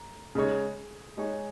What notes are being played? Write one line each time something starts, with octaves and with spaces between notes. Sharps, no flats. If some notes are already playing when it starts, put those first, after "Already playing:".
Already playing: A#5
C#3 G#3 D#4 G#4 C#5
G#3 D#4 G#4 C#5